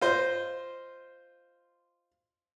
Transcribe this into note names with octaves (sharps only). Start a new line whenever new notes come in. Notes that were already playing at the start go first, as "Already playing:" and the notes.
F4 C5 D#5